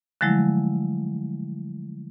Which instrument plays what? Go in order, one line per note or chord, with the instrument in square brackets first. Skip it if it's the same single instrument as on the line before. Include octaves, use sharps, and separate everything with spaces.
[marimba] D3 F3 F#3 G#3 A3 E4